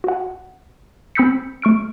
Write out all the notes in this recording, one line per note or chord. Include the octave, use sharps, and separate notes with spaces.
F#4 F#5
C4 B5 E6 G6 B6 C#7
A3 C#6 F6 D7